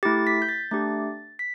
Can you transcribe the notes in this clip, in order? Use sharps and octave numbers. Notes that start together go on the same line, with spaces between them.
A3 E4 G4 A6
B6
G6
A6
A3 D4 G4 A6
B6